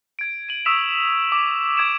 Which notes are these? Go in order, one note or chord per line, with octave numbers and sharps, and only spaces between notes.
G#6 D7
D#7 F#7
C#6 D#6 E6 B6 E7 F7
D6
D6 G#6 D7 E7